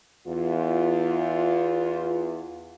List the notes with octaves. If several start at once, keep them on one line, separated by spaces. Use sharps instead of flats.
E2 F4